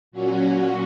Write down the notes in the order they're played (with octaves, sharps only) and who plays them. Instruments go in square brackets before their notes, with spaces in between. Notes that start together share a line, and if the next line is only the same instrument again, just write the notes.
[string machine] A#2 F#3 C#4 F#4